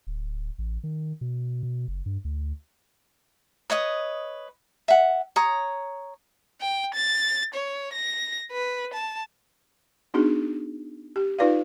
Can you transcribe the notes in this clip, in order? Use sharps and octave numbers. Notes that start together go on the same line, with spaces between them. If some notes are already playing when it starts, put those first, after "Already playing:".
D1
A1
D#3
B2
B2
F#1
G2
D2
B4 C#5 D#5 D#6
E5 F#5
C#5 A#5 D#6
G5
A6
C#5
A#6
B4
A5
B3 D4 D#4 F#4 G#4
G4
D#4 F4 B4 D5 F5